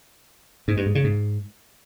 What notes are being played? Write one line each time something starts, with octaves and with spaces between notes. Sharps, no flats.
G#2
G2
G#2
C#3
G#2